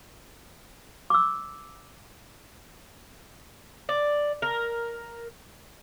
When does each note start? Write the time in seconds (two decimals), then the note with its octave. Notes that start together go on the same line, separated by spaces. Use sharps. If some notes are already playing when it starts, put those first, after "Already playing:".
1.10 D6 E6
3.89 D5
4.42 A#4